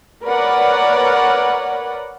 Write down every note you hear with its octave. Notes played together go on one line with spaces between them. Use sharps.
A#4 B4 C#5 D5 F#5